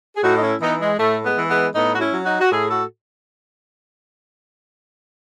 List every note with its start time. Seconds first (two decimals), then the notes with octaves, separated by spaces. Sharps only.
0.17 G#4
0.24 A2 D#4 F#4
0.37 D#4
0.42 C#4 E4
0.61 E3 B3 D#4
0.81 G#3
1.00 A2 A3
1.25 G#3 B3
1.38 E3
1.50 G#3 B3
1.75 A2 B3 D#4
1.95 F#4
2.00 C#4 E4
2.13 F#3
2.26 D#4 F#4
2.41 F#4
2.52 A2 E4 G#4
2.71 F#4 A4